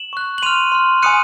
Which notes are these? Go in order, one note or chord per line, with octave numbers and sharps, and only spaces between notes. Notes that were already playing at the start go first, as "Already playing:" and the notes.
Already playing: E7 F#7
C#6 F#6
F#7
C6 F6 D#7 F7
C6 F6
G#5 B5 D#6 F#6 C#7 D#7